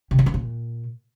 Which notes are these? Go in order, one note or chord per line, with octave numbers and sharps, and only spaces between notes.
C3
F#3
F3
A#2